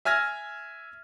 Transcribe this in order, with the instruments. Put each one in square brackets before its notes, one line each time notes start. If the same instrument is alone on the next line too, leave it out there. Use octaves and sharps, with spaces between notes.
[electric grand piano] E5 G#5 F6 G#6 A#6